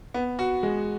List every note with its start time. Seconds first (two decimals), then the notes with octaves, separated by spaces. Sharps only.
0.14 B3
0.39 F#4
0.63 G#3